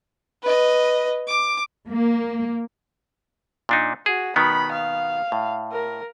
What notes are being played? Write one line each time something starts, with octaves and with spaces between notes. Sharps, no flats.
B4 D#5
D6
A#3
A#2 D4 D#4
F#4 G#4
B2 D#3 B3 B5
F5
A2
A#4